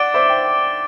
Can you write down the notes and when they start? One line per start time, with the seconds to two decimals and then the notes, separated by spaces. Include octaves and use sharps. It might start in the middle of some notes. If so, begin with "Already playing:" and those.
Already playing: D5 F#5 D6 A6 D7 G7
0.14 C5 E5
0.29 G5